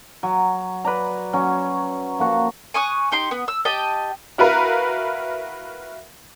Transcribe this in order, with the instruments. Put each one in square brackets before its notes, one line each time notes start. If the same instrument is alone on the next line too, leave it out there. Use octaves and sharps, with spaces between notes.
[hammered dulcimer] F#3
B4 D5 A#5
F#3 C#4
F3 A#3 F#4
[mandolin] G#5 C#6 D#6 F#6
D#4 G4 C6
B3
E6
G4 D#5 G5 A5
[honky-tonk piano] E4 F#4 A#4 B4 F5